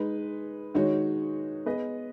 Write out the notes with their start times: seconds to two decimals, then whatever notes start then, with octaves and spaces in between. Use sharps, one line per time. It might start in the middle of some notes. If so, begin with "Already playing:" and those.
Already playing: G#3 D#4 B4
0.74 D#3 G#3 D#4 F#4 C#5
1.66 B3 G#4 B4 D#5